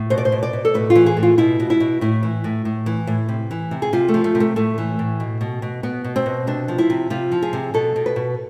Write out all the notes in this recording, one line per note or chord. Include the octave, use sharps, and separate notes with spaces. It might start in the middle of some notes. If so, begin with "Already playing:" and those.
Already playing: A2
B2 C5
D5
C5
B2
D5
B2
A4
A2 B4
F4
E3
G#4
A2
F4
B2 E4
B2
E4
B2
A2 E4
E3
A2
A2
E3
A2
C3
E3
C3
G#4
C3 F4
A3
F3
A3
C3
A3
A2 A3
E3
A2
B2
B2
B2
B2 B3
B2
C4
B2
C3 D4
F3
E4
C3
C3 F4
F3
G#4
C3
B2 A4
B2
B4
B2